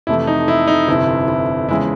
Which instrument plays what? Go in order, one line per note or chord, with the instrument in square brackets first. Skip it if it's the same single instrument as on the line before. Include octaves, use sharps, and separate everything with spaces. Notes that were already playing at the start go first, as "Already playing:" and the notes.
[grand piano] F2 C3 E3 A3 E4
D#4
E4
D#4
G1 F2 C3 E4
E4
E2 C#3 F3 G#3 E4